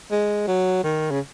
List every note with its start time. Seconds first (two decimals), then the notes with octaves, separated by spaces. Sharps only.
0.11 G#3
0.48 F#3
0.83 D#3
1.11 C#3